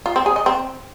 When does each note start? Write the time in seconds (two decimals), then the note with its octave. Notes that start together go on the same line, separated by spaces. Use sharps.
0.06 F4
0.16 C4
0.26 G#4
0.36 D#5
0.46 C4